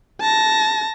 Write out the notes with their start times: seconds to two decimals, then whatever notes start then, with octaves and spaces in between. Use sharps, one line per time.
0.21 A5 A#6